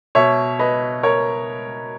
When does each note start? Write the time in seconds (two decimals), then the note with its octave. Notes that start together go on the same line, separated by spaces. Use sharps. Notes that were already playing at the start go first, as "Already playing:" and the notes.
0.15 B2 C#5 E5
0.59 B4 D#5
1.03 A#4 C#5